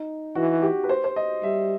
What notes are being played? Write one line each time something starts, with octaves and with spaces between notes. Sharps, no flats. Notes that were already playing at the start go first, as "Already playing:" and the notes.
Already playing: D#4
E3 F#4
G4
B4
C5
C5
D#5
G3 E5